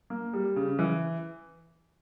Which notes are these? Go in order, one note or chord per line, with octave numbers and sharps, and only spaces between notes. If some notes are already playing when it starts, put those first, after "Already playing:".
A#3
G3
C#3
E3